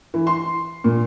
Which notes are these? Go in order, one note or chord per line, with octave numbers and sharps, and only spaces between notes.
E3
C6
A#2